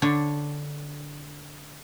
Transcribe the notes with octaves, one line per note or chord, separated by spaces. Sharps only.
D3 D4 C#5